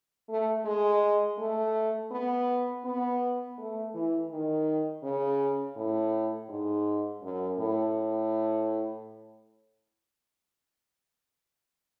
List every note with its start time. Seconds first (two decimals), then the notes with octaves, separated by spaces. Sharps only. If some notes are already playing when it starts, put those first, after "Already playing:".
0.29 A3
0.65 G#3
1.38 A3
2.11 B3
2.85 B3
3.58 A3
3.94 E3
4.31 D#3
5.03 C#3
5.77 A2
6.49 G#2
7.23 F#2
7.59 A2